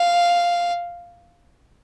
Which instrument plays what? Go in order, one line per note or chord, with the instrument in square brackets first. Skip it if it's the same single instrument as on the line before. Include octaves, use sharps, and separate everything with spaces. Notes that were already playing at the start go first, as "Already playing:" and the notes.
Already playing: [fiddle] F5